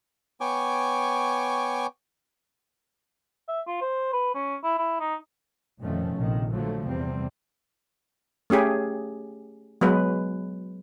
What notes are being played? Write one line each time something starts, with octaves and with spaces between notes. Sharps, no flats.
B3 C#5 G5 G#5 C#6 D6
E5
F4
C5
B4
C#4
E4
E4
D#4
F1 A#2 D#3 F3 A3 C#4
A#1 C3 D#3
D3 F3 F#3 A3
E2 C3 G3 C4
A3 C#4 G4 G#4
F#3 G#3 B3 B4